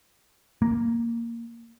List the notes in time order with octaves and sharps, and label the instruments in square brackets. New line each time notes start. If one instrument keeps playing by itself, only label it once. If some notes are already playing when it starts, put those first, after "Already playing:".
[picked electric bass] A#3